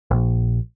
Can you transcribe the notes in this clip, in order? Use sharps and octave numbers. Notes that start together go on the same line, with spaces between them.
A#1